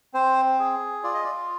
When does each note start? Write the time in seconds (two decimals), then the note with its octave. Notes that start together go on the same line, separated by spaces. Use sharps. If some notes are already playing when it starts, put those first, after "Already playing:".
0.14 C4 C5
0.59 G#4
1.03 F4 D5
1.14 D#5
1.24 D5